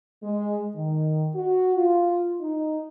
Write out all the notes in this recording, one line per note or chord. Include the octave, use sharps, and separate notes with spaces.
G#3
D#3
F#4
F4
D#4